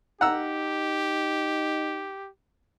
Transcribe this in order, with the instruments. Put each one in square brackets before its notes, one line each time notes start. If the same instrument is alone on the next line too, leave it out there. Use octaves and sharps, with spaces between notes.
[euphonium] D#4 [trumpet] G4 [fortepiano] F#5 A#5 E6